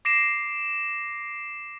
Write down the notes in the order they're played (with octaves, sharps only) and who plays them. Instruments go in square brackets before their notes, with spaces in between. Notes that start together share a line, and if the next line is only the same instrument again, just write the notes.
[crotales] D6 A#6 C7 D7 E7